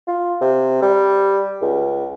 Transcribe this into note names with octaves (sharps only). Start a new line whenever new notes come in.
F4
C3
G3
C#2